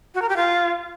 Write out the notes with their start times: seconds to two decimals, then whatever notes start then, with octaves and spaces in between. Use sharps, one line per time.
0.14 F#4
0.22 A#4
0.29 G4
0.36 F4